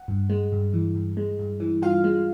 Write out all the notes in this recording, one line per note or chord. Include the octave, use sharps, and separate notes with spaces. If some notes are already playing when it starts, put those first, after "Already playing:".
Already playing: F#5
G2
G#3
G2
E3
G2
G#3
G2
E3
G2 F4 F5
G#3